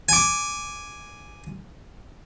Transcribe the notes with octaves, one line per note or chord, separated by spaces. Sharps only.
G#5 D6